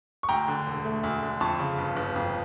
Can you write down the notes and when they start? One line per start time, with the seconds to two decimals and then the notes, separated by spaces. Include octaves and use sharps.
0.23 C#6
0.29 D2 G5 A#5
0.48 D3
0.66 E1
0.84 A3
1.03 D2
1.23 D3
1.41 F2 A5 C#6
1.59 C#3
1.78 G1
1.97 G1
2.16 F2